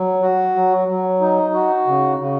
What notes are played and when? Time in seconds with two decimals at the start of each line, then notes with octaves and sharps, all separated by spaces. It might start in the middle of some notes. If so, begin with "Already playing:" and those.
Already playing: F#3
0.22 F#4
0.55 F#3
0.88 F#3
1.21 D#4
1.54 F#4
1.87 C#3
2.19 C#3